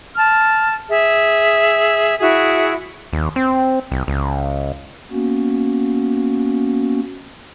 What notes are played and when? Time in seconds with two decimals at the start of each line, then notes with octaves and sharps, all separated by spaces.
0.17 A5 F6
0.90 G#4 E5
2.20 E4 F#4 G#4 E5
3.13 D#2
3.36 C4
3.92 C2
4.08 C#2
5.11 A#3 B3 C#4 F#4